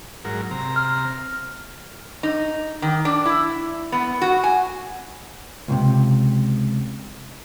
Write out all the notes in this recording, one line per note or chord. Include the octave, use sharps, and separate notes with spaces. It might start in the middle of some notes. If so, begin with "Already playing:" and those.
G#2 F#3 A#4
C3 A#5
F6
D#4
D#3
D4
E4
B3
F#4
G#5
C#2 A2 C3